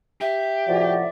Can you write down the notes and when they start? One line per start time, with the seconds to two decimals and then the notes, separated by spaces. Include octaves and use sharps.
0.21 G4 E5
0.67 A2 C3 F3 F#4 D5